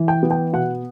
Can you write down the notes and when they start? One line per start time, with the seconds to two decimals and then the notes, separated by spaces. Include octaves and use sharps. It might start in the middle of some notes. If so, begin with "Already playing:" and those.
Already playing: E3
0.08 G5
0.23 B3
0.31 G5
0.53 B2 F#5